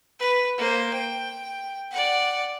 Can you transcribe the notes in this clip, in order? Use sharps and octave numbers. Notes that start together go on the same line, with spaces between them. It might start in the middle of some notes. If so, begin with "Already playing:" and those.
B4
A#3 C5
G5
D5 F#5